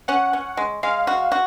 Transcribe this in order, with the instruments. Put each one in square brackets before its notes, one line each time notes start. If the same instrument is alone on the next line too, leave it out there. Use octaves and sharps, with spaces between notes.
[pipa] C#4 [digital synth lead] F#5
[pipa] C#4
G#3
[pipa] G#3 [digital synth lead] F5
[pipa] F#4
F#4